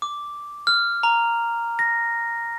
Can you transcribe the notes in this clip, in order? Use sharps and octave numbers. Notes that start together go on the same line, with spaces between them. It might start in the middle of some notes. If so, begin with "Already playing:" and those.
D6
F6
A#5
A#6